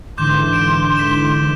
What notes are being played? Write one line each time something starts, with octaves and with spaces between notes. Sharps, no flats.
G#2 D3 E3 C6 D6 G6 E7
D7 E7
B6 E7 G7